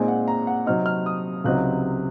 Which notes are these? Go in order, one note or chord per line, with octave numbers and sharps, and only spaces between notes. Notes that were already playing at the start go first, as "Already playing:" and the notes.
Already playing: A#2 G#3 C4 D#4 G#5
F#5
A#5
F#5
C3 F#3 C4 D#4 F6
F6
D#6
C#2 C3 F#3 C4 D#4 F#6